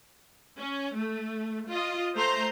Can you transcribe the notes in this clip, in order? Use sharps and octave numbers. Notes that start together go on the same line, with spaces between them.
C#4
A3
F4 D#5
A3 C5 A#5 C6